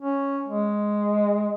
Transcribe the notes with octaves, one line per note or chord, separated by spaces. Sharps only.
C#4
G#3